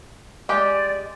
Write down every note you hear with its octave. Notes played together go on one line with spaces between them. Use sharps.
G#3 G4 D5